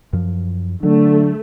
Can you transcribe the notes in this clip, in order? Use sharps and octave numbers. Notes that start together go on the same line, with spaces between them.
F#2 F3
D3 F#3 A3